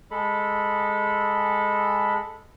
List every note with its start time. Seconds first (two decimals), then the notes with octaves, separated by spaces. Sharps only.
0.11 G#3 A4 B5